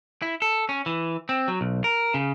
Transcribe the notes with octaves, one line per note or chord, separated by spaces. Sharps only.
E4
A4
C#4
E3
C4
F#3
B1
A#4
C#3